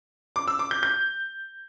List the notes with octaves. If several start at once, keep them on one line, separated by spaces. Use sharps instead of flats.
D6
E6
D6
G6
G6